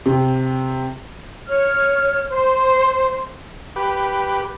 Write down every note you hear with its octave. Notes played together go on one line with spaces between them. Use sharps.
C3
C#5 F6
C5
G4 B4